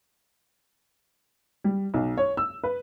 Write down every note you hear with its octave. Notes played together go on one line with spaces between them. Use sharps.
G3
B1
C#5
E6
B4